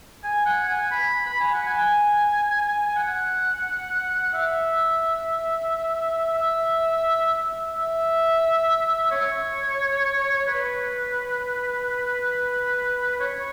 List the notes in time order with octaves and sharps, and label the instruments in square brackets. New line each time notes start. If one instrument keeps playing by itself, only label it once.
[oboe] G#5
F#5
G#5
B5
B5
G#5
F#5
G#5
F#5
E5
E5
E5
C#5
B4
C#5